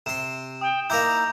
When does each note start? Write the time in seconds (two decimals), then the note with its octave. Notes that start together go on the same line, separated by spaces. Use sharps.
0.06 C3 C6 E7
0.61 G5 D#6
0.90 A#3 D#4 E4 A#5 D6 G6